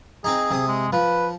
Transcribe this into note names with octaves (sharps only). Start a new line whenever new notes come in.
C4 D#4 G#4
C3 D#6
G#3
F3 B4